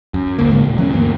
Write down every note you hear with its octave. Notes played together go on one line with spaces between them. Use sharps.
F#2
G1 D2 A#3
G#2 C#3 G#3 A#3
D#1 A#2
E3 F#3 B3 C#4
D2 G2 A#3